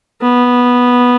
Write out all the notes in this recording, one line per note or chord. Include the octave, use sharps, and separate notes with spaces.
B3